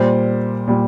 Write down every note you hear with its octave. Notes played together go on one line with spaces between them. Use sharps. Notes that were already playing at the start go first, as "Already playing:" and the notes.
Already playing: A#2 G3 C5
A#2 G3